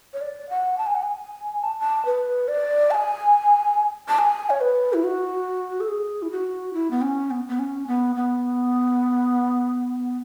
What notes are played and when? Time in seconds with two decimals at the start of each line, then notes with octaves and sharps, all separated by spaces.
0.13 C#5
0.21 D5
0.49 F#5
0.78 A5
0.86 G#5
0.94 F#5
1.03 G#5
1.63 A5
1.80 A5
2.05 B4
2.48 D5
2.90 A5
2.94 G#5
4.08 A5
4.18 G#5
4.50 C#5
4.61 B4
4.93 E4
5.04 F#4
5.80 A4
5.88 G#4
6.22 E4
6.31 F#4
6.74 E4
6.91 B3
7.02 C#4
7.31 B3
7.49 B3
7.59 C#4
7.87 B3
8.15 B3